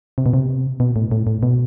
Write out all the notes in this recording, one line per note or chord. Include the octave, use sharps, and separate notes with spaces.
C3
B2
C3
B2
A2
A2
A2
B2